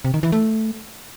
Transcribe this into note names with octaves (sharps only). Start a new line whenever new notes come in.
C3
D#3
E3
A3